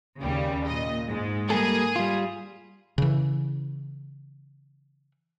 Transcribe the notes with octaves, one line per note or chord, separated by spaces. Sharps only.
D#2 C#3 G3
A#2 D#5
G#2 G#3
G3 A#3 G#4 A4
G3 F4
C#3 E3